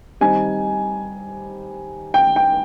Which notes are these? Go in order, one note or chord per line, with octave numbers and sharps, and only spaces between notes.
D#3 G3 C4 D#4 G#5
G5
G5